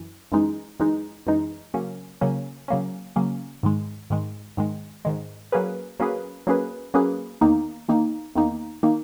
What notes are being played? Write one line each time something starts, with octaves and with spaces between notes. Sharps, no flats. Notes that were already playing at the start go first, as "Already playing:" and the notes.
Already playing: F#2 E3
F#2 E3 G#3 D#4
F#2 E3 G#3 D#4
F#2 E3 G#3 D#4
C#3 F#3 A#3 C#4
C#3 F#3 A#3 C#4
C#3 F#3 A#3 C#4
C#3 F#3 A#3 C#4
G#2 D#3 G#3
G#2 D#3 G#3
G#2 D#3 G#3
G#2 D#3 G#3
F#3 A#3 C#4 G#4 B4
F#3 A#3 C#4 G#4 B4
F#3 A#3 C#4 G#4 B4
F#3 A#3 C#4 G#4 B4
E2 D#3 A#3 D#4
E2 D#3 A#3 D#4
E2 D#3 A#3 D#4
D#3 A#3 D#4